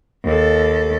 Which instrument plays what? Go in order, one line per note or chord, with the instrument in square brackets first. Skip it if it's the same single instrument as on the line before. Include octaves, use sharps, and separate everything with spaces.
[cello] D#2 A4